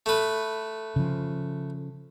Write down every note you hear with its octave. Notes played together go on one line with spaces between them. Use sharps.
A3 B4
C#3 F3